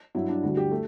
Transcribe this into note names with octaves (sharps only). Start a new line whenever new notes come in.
G2 F#3 E4
D4
D2 D3 G3 F#4
G4
A3